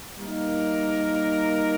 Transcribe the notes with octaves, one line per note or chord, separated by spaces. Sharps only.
G3 A#3 D#4 A#4